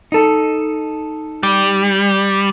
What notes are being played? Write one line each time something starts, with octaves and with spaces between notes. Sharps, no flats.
D#4 A4
G3